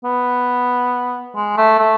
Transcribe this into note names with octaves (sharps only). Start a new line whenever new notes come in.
B3
G#3
A3
A3